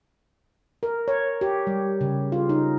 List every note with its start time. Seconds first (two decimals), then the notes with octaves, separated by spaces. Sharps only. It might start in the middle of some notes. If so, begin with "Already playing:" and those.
0.83 A#4
1.08 C#5
1.41 G4
1.67 G3
2.01 C#3
2.32 F4
2.49 D#4